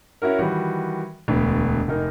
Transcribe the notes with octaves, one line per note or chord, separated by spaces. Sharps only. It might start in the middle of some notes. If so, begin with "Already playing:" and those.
C#4 E4 F#4 A#4
D#3 E3 G3 F#4
E1 D2 B3
F1 D#4 A#4